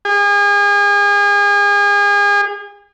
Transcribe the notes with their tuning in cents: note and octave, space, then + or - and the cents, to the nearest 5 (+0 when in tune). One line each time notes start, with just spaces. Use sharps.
G#4 -35